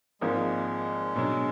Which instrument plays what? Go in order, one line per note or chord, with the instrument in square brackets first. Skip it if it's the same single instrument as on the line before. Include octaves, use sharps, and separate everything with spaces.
[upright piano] G#1 G#2 F3 A#3 [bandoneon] G#3
[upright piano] B2 F#3 D4